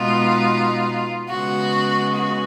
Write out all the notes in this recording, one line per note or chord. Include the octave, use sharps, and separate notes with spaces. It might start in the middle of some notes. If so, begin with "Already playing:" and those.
Already playing: B2 G#3 B3 D#4 F4
C#3 G#3 B3 F#4
F#4